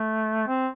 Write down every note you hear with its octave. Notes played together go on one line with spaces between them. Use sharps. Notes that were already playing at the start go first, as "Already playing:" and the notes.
Already playing: A3
C4